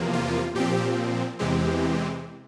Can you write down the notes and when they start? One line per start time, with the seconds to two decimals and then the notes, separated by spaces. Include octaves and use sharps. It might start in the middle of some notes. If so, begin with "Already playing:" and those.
Already playing: E2 C3 F3 A#3
0.13 F4
0.55 A#2 F3 C4 G4
1.39 E2 C3 E3 G#3 C4 G4